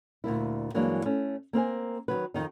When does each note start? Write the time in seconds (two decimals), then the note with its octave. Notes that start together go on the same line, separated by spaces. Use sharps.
0.24 D2 A#2 A#3 E4
0.74 G2 E3 F#3 G#3 A#3 D4
1.05 A3 C#4
1.53 A#3 C4 A#4 G#5
2.08 D#3 F3 F#3 B4
2.34 F2 D#3 D#4